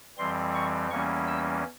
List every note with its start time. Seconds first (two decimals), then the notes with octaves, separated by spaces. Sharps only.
0.18 F2 E3 G3 C4 C6
0.54 C#6
0.90 E2 E3 G3 A#3 C#4 C#6
1.27 E6